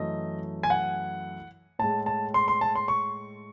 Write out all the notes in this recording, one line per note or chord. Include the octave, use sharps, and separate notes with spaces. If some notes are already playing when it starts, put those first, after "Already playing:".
Already playing: F#2 E3 A3 D#5
G#5
F#5
A2 G#3 A5
A5
C6
C6
A5
C6
C#6